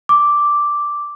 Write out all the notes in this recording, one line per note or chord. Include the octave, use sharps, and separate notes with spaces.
D6